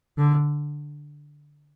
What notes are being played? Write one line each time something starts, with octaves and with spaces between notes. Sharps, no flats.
D3